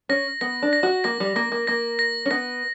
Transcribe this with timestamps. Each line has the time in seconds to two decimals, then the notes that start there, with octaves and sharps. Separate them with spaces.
0.09 C#4 A#6
0.41 B3 A#6
0.63 D4
0.73 A#6
0.83 F#4
1.04 A#3 A#6
1.20 G3
1.36 A#3 A#6
1.52 A#3
1.67 A#3 A#6
1.99 A#6
2.26 C#4
2.31 B3 A#6